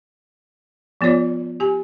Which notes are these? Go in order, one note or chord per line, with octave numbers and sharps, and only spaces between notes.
F3 B3 F4 C#5 D5
G4 G#5